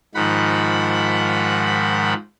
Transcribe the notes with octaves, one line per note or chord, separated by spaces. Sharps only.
G#2 D#3 F3 F#5 B5